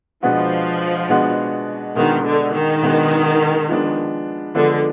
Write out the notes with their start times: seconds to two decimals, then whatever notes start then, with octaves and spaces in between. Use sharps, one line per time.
0.23 B2 F3 G#3 B3 D4 F#4
1.09 B2 G#3 B3 D4 F#4
1.96 B2 D#3 G#3 B3 D4 F#4
2.25 D3
2.53 D#3
2.82 B2 G#3 B3 D4 F#4
3.69 F3 G#3 B3 D4
4.55 D3 F3 G#3 B3 D4